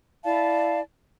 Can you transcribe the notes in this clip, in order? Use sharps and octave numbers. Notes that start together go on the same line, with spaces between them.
E4 D5 F5 A5